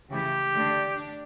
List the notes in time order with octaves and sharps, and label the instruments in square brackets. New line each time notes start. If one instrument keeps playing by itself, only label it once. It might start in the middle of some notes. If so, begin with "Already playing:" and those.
[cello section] C#3 E3 A3 E4 [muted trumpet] G4
[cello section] D3 A3 D4
D4